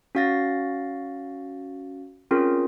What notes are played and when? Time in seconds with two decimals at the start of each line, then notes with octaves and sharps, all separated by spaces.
0.15 C#4 F#4 F5 A6 A#6
2.31 C4 C#4 F4 G#4 A#4